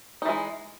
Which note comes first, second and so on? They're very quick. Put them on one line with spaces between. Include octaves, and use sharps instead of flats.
D#4 E3 G#3